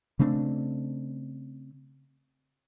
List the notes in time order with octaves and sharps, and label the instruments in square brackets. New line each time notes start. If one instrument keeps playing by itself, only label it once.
[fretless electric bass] C#3 A3 C4 D4